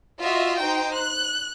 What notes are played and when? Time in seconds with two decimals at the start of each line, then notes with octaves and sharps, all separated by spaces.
0.21 F4 F#4 D#5 E5
0.60 D#4 C5 G5
0.95 F#6